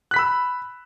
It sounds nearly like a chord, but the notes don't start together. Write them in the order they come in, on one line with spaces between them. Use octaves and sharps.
F#6 B6 B5 E6